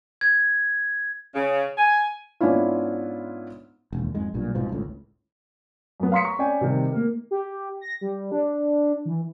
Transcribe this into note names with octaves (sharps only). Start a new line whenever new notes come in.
G#6
C#3
G#5
G#2 B3 C#4 D4 E4 F4
E1 D#2
F2 G#2 G#3
B1 G2 A#2
C2 G#2 B2 F3
G1 C#2 A2
F#2 B3
F5 A#5 C6 D#6 B6 C#7
A#5 C#6
C#4 D5 G5 G#5
C3 D#3 G3
A#3 A#4
G4
A#6
G3
D4
E3